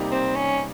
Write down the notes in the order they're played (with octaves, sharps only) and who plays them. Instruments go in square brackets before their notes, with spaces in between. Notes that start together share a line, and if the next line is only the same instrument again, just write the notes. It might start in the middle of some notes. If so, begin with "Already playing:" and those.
Already playing: [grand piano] C3 G3 A#3 D#4 G4
[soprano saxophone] C4
C#4